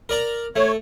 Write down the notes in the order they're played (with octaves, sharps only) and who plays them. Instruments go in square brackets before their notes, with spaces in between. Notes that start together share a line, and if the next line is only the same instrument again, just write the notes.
[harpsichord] A#4 D5 A#5
[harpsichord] A3 [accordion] C#5